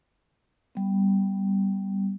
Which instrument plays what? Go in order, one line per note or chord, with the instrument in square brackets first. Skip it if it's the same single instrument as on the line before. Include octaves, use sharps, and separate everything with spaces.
[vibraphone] G3 B3